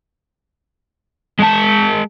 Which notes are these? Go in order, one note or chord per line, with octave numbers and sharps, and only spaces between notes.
G#3 A5